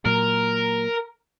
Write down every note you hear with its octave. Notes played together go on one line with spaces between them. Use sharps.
A#2 F#3 A#4